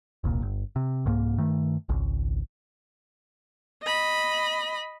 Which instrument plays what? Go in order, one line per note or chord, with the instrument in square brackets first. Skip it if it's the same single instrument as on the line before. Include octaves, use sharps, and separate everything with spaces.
[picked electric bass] E1 C2 A#2
G1
C3
C2 G#2 A#3
G2 D#3 A3
G#1 C#2
[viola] D#5 B5